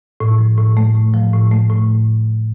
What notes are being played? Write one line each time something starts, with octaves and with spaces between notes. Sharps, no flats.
A2
F3
A2
A3
A2
F3
A2
A3
A2